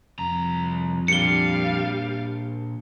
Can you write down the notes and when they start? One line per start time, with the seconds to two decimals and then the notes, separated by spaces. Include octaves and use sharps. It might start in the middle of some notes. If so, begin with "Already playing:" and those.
0.19 C2 F2 A#5
1.08 A#2 G3 D4 F5 C#7 G7